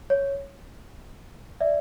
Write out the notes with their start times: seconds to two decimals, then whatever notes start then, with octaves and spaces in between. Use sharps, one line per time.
0.10 C#5
1.61 D5 E5